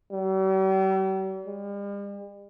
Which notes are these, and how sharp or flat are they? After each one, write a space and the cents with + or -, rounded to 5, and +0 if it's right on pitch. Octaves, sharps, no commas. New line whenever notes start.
G3 -45
G3 +45